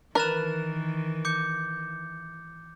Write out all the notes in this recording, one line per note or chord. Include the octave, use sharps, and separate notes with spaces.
D#3 E3 A#4 B4 F#6 A6 E7
D6 G6 C#7